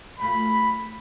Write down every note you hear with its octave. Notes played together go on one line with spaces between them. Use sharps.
F#2 A3 F4 B5